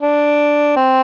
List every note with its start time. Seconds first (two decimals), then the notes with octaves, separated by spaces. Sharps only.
0.02 D4
0.77 C4